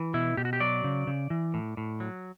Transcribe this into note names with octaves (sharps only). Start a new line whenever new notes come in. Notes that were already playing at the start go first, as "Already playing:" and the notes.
Already playing: E3
B2 E4
B2 G4
F#4
G4
F#3 D5
C#3
C#3
E3
A2
A2
F#3